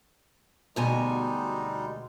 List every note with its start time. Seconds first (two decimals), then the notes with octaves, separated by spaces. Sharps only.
0.76 D2 B2 G3 G#3 D#4 G#5